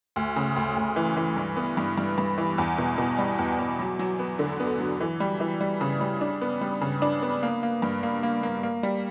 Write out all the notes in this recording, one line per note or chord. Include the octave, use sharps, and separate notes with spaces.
D2
C#3
D2
D2
E3
E3
G2
B3
G2
G2
G2
E3
E2
B2
B2
G3
E2
E2
F#3
F#3
B3
D3
B3
F#3
E3
G3
E3
G3
C#3
G3
D4
B3
G3
C#3
D4
B3
A#3
A#3
G2
A#3
A#3
A#3
A#3
G3